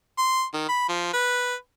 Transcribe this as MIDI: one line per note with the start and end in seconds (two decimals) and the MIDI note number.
0.18 0.44 84
0.54 0.65 51
0.69 0.84 83
0.89 1.10 53
1.14 1.55 71